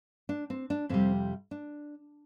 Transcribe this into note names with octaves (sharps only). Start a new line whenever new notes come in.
D4
C4
D4
F2 C3 G3 C4
D4